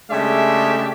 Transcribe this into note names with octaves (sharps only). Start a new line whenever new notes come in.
C#3 G#3 A3 D4 G4 E5